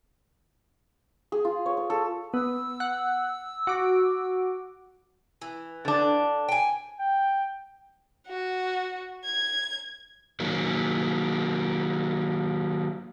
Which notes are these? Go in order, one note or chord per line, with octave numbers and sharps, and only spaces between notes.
G#4
F4
C#5
C#5
A4
B3 E6
F#5
F#4 D6
E3
D3 D4
G5 G#5
G5
F#4
G#6
D#3 F#3 A#3